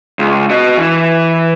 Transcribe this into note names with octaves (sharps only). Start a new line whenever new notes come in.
C#2
F#4 D#5
E3